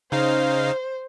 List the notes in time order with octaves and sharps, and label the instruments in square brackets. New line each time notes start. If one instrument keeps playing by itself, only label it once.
[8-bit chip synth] C#3 D#4 F5 [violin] C5